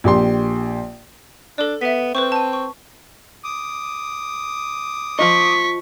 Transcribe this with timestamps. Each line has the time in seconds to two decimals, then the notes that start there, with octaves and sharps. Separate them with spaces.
0.04 A#1 G4 C6
1.58 D4 A4 D5
1.81 B3 E5 B6
2.15 C4 B4 C5 C#6
2.32 A5 D#7
2.53 C#6
3.44 D6 D#6
5.19 F3 F4 D#5 C#6 B6